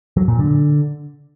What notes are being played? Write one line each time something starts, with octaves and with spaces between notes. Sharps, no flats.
F#3
A#2
D3